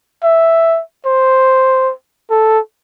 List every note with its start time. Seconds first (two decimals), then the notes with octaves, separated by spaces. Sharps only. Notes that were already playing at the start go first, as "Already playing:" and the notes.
0.24 E5
1.06 C5
2.30 A4